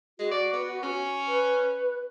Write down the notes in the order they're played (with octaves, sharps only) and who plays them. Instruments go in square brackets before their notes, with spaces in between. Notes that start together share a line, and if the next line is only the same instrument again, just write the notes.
[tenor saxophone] G#3 [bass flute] F#4
[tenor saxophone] D5
B3
C#4
[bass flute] B4